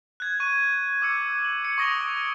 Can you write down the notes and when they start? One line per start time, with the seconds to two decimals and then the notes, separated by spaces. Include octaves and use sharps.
0.20 F#6 G#6
0.40 C#6 D#7
1.02 D6 E6 C#7
1.45 F#7
1.65 C#7
1.78 C#6 D#6 A#6 D7 G7